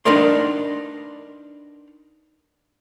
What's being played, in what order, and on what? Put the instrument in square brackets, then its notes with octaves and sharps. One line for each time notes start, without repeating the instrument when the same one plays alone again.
[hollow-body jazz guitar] D4 D#4 A#4 B4 D5 C6